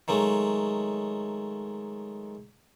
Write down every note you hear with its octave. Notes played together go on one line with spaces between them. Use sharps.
D#3 F#3 G#3 A3